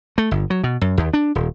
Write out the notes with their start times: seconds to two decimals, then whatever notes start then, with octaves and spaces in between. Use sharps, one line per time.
0.18 A3
0.31 G1
0.50 F#3
0.64 B2
0.81 F#2
0.98 D#2
1.14 D4
1.35 D#1